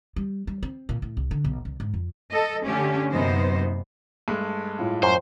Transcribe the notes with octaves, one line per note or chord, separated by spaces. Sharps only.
G3
G3
C4
A#2
A2
C2
D3
B1
C2
G#2
F2
A4 D#5
D3 A3 C#4 G4
F#2 C3 A#3 B3 D#4 C5
G2 G#3 A3
A2 F4
F#2 C5